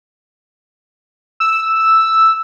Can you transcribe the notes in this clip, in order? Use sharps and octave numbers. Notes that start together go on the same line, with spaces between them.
E6